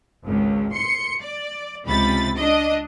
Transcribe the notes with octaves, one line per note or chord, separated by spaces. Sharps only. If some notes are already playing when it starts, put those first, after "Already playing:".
G#1 C#2
C6 C#7
D5
C#2 C3 B5 A6
D4 D#5